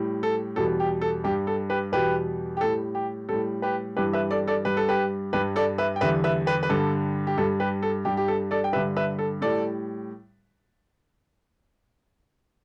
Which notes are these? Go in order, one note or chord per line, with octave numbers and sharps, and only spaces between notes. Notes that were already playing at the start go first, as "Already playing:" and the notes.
Already playing: A2 G3
A4
E2 B2 G3 A4
G4
A4
G2 G3 G4
A4
G4 B4
E2 B2 G3 G4 B4
G4
A2 G3 A4
G4
A2 G3 A4
G4 B4
G2 E3 G3 G4 B4
B4 E5
A4 D5
A4 D5
G2 G3 B4
A4
G4 B4
G2 G3 G4 B4
A4 D5
B4 E5
G5
E2 D3 G3 B4 E5
B4 E5
G4 B4
B4
G2 D3 G3 A4
G4
G2 G3 A4
G4 B4
A4
G2 G3 G4
G4
A4
A4 D5
G5
G2 D3 G3 B4 E5
B4 E5
A4
A2 G3 A4 D5